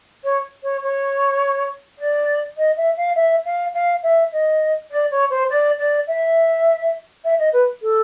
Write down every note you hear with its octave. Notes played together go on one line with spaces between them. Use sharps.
C#5
C#5
C#5
D5
D#5
E5
F5
E5
F5
F5
E5
D#5
D5
C#5
C5
D5
D5
E5
E5
D#5
B4
A4